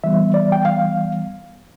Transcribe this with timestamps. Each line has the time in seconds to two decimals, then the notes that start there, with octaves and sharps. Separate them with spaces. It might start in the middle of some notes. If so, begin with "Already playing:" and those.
0.04 E3 G3 B3 E5
0.34 D5
0.52 G5
0.65 F5